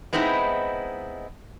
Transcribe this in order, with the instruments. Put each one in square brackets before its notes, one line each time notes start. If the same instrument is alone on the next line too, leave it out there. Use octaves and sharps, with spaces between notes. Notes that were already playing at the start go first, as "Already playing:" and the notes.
[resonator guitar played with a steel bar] G#3 B3 C4 D#4 E4